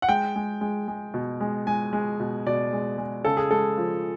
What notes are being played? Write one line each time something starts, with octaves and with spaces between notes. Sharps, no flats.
F#5
G#3 G5
G#3
G#3
G#3
B2
G#3
G#3 G#5
G#3
B2
B2 D5
G#3
G#3
C#3 A4
G#4
G#3 A4
F3